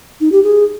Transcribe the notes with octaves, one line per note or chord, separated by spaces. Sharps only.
D#4
G4
G#4